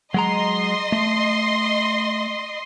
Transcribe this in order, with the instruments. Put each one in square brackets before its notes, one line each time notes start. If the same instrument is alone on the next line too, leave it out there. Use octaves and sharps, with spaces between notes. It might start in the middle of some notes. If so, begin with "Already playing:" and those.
[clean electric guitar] F#3 G#3 A#5 [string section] D#5 C6
[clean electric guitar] A3